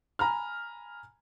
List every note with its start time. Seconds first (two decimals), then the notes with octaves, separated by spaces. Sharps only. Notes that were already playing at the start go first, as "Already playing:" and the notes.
0.19 G#5 A#5 B5 F6